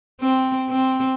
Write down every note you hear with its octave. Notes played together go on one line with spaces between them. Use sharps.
C4
C4